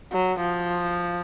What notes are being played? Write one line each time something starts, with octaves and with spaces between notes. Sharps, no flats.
F#3
F3